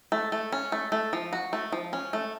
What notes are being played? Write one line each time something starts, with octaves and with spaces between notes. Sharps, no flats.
A3
A3
C#4
A3
A3
F3
F#4
A3
F3
C#4
A3